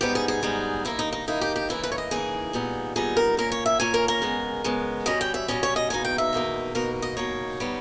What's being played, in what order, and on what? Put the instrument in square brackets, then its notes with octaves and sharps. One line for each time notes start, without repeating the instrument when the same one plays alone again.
[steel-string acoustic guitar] G#2 G3 B3 D#4 G4
G#4
G#4
G#2 G3 B3 D#4
G2 D#3 A#3 D#4 E4
D#4
D#4
G2 D#3 A#3 D#4 E4
G4
G4
C#3 E3 A#3 D#4 E4
B4
C#5
D#5
C#3 E3 A#3 D#4 G#4
A#2 G3 B3 D#4
A#2 G3 B3 D#4 G#4
A#4
A#2 A#3 C#4 A#4
C#5
E5
A#2 A#3 C#4 G#5
A#4
A#4
C#3 G#3 B3
C#3 G#3 B3
B2 G3 C#4 D#5
G5
E5
B2 G3 C#4 D#5
C#5
D#5
E2 B2 A#3 D#4 G#5
G5
E5
E2 B2 A#3 D#4
B2 A#3 D#4 A#4
D#5
B2 A#3 D#4 C#5
G3 B3 D#4